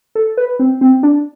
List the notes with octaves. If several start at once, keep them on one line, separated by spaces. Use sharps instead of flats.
A4
B4
C4
C4
D4